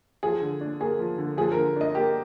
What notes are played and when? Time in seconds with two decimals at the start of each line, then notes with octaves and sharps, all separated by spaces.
0.23 F3 G#4
0.42 D3
0.61 D4
0.80 A#3 G#4
0.99 F3
1.18 D3
1.37 F3 G#4
1.52 A#4
1.57 D3
1.76 D4 D#5
1.95 A#3 G4